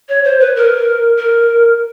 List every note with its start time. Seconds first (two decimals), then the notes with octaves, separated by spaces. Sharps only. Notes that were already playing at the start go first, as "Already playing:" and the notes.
0.09 C#5
0.24 C5
0.40 B4
0.56 A#4
1.18 A#4